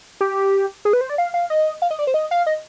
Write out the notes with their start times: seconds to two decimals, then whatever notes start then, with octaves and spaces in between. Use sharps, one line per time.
0.21 G4
0.85 G#4
0.93 B4
1.01 C5
1.10 D5
1.18 F5
1.34 F5
1.50 D#5
1.82 F5
1.91 D#5
1.99 D5
2.07 C5
2.14 D#5
2.31 F5
2.47 D#5